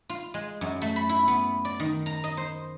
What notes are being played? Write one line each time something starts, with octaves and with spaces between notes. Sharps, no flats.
F4
G#3
F#2
A3
B5
E4
B3
D5
D#3
A#5
D#5
C5